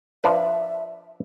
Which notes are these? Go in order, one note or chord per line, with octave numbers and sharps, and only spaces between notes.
F3 D4 B4 E5